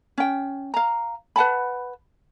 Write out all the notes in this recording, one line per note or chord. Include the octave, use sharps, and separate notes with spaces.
C#4 G5
F5 A#5
B4 F#5 A5 B5